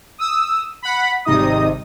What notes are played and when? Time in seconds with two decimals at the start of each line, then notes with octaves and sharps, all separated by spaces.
0.19 D#6 E6
0.82 F#5 B5
1.25 G#1 C3 G3 D#4 D#5 D#6